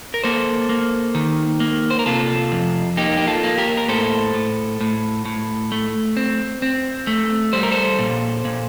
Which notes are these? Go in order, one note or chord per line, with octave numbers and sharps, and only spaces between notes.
A#4
A#3 A4 C5
A#3
D#3
A#3
C5
A#4
C3 F4 A4
F2
A#3 D#4 G4
G4
F4 A4
A#3
G4 A#4
A#4
A2 A4 C5
A2
A2
A2
A3
C4
C4
A3
G3 C5
A#4
A4 C5
A#2
A#2